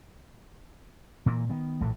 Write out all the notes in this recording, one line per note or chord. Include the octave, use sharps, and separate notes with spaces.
A#2 E3 A#3
D#3 B3
A#1 A2 E3 A3